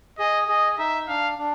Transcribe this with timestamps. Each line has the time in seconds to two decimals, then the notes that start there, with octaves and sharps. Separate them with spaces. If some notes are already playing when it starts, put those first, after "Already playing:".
0.18 G#4 D#5
0.48 G#4 D#5
0.78 D#4 E5
1.08 D4 F5
1.38 D4